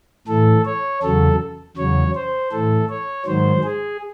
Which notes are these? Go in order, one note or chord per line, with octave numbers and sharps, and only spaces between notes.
A2 E3 A4
C#5
E2 C#3 F#3 A4
E2 C#3 F#3 C#5
C5
A2 E3 A4
C#5
G#2 D#3 F#3 C5
G#4